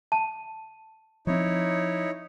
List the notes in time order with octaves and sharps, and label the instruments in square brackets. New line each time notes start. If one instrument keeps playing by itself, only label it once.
[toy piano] A5
[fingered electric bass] F3 C4 [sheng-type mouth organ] D#4 E4 C#5